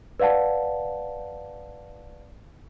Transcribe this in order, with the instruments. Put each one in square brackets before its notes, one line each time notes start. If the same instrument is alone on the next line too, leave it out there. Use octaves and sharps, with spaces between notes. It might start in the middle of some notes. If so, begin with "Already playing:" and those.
[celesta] B4 D5 F5 F#5 A5